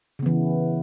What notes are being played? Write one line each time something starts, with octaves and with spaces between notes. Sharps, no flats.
C#3 E3 B3